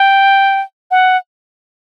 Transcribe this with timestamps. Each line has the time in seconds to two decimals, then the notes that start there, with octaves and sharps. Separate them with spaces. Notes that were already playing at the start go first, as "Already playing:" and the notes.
Already playing: G5
0.91 F#5